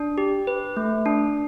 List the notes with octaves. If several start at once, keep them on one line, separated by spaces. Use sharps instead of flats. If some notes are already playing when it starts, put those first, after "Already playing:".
Already playing: D4
G4
B4
A3
D4